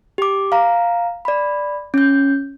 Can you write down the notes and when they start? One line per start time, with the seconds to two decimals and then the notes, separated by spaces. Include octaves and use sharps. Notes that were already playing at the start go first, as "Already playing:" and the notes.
0.18 G4 D6
0.52 F5 A#5
1.25 D5 B5
1.94 C#4 G6